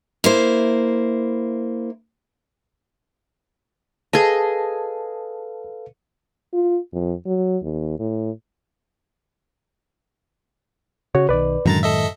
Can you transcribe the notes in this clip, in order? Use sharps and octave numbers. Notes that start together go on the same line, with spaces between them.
A#3 E4 C5
G#4 A4 B4 D#5 F5 A5
F4
F2
F#3
D#2
A2
C#3 F#4 C#5
B1 D#3 B4 D5
F#2 A2 D3 D#3 G#3 A#5 A6
A4 D#5 E5